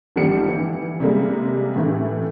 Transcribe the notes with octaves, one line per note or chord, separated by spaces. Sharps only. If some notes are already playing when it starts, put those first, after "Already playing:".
G#1 F3 G3 A#3 G4 C#7
E3
C3 G3 G#3 A#3
A2 E3 A3